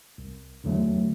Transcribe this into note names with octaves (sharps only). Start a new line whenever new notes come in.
C2
E2 D3 F#3 A3